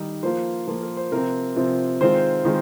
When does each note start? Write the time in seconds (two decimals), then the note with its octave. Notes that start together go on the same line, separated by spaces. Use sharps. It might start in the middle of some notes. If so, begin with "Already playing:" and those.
Already playing: D#3 G3 D#4
0.23 F3 A#3 F4 C5
0.67 F3 A#3 F4
0.83 A#4
0.97 C5
1.12 C3 F3 C4 A#4
1.56 C3 F3 C4
2.01 D#3 G#3 C4 F4 C5
2.45 D#3 G#3 C4 F4